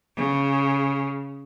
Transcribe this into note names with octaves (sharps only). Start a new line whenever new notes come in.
C#3